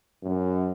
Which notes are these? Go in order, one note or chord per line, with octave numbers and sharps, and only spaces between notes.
F#2